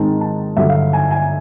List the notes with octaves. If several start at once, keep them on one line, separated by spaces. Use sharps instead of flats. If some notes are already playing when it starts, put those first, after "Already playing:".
Already playing: G#2 D#3 G#3 C4 D#4 A5
A5
G2 D3 F#3 E5
F5
G#5
G#5